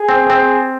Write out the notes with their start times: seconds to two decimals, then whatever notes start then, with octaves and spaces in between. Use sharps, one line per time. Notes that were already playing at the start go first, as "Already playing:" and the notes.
Already playing: G#4
0.09 C4
0.30 C4